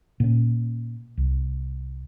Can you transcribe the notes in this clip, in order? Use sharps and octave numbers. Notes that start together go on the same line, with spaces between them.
A#2 C#4
C2